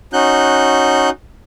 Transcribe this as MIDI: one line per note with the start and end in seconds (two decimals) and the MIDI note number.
0.13 1.10 61
0.13 1.10 63
0.13 1.10 66
0.13 1.10 90
0.13 1.10 91